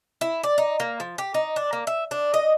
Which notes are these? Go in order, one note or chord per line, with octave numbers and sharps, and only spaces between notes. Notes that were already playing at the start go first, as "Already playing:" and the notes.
E4
D5
D#4
A#3
F3
G4
D#4
D4
A#3
E5
D4
D#5